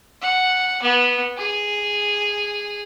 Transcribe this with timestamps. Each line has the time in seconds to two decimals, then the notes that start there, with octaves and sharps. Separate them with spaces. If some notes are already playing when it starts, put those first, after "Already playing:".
0.22 F#5
0.82 B3
1.37 G#4